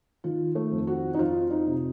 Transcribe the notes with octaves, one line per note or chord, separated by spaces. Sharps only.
D#3 F4
A3
F2
F#4
D#4
F2 F4
D#4
C3